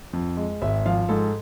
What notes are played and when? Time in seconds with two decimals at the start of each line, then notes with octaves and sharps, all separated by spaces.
0.13 F2
0.37 G#3
0.62 G#1 E5
0.86 F3 F5
1.09 G#2 A4